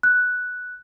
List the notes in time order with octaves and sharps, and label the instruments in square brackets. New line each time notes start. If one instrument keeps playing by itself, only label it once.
[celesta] F#6